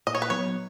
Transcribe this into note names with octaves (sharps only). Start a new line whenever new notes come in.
A#2 D#5
C#5
B4
F#3 B3 D#4 C#5